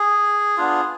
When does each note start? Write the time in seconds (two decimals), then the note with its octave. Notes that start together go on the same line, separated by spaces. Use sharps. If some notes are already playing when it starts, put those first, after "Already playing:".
Already playing: G#4
0.57 B3 D4 F4